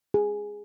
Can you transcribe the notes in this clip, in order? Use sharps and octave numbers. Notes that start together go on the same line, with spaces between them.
G#4